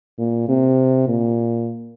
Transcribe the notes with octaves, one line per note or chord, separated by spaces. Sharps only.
A#2
C3
A#2